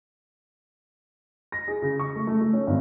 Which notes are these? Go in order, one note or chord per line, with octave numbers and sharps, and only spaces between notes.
A#6
G#4
C#3
C#6
A3
A3
A3
C#4
G#1